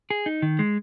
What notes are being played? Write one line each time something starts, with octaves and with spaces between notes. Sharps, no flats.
G#4
D#4
D#3
G#3